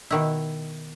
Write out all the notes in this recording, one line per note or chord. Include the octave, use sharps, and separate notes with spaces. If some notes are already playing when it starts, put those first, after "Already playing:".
B2 D#3 E4